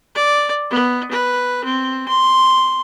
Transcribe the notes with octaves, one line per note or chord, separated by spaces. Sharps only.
D5
B3
B4
C4
C6